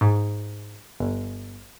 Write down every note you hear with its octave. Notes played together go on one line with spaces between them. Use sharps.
G#2
G1